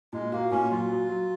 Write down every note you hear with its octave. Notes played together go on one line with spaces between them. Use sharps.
A#2 G#3
A#3 F#4
A#2 C#4
F#3 F4
F#3
F#3